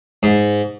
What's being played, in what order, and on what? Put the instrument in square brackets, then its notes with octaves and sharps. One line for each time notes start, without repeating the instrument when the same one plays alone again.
[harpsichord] G#2